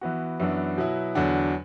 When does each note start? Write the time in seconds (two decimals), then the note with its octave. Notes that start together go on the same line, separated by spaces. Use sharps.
0.01 E3 B3 F#4
0.40 F#2 E3 B3 D4 F#4
0.78 B2 F#3 B3 E4
1.15 E2 D3 F#3 D4 F#4